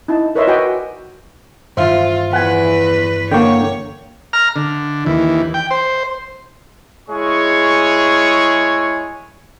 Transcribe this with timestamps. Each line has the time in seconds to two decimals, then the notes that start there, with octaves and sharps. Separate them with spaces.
0.08 D#4 E4 A5
0.35 A#4 B4 C#5 D#5 E5 C6
0.47 F#4 B4 D5 D#5 G5 G#5
1.77 G2 D#3 E3 F4 C5 E5 F5
2.33 E2 B4 F#5 G#5
3.31 D3 A#3 C#5 G5 C#6
4.33 A#5 F6
4.56 D3
5.06 D#2 E3
5.54 G5
5.71 C5
7.09 G#3 E4 G#4 C#5 C#6